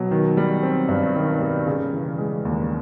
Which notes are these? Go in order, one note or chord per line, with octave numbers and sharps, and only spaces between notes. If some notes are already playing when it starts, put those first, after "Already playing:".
Already playing: B2 F#3
D#3
G3
C4
G2
D#3
G3
C#3
E3
G#3
D#2